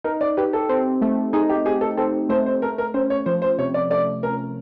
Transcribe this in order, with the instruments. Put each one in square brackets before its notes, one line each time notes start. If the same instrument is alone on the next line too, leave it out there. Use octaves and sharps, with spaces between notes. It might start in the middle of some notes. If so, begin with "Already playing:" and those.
[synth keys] D#4 [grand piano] A#4
[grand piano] D5
[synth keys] G4 [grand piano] B4
[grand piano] A4
[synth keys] C4
A3
[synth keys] D#4 [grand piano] G#4
[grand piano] G4
[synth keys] G4 [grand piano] G#4
[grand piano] A4
[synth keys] C4 [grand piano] A4
[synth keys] A3 [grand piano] C5
[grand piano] C5
[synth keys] A3 [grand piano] A#4
[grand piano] A#4
[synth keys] C#4 [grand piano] C5
[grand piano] C#5
[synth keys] F3 [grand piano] C5
[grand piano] C5
[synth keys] C3 [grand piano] C#5
[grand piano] D5
[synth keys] A3 [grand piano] D5
[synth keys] C#4 [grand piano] A#4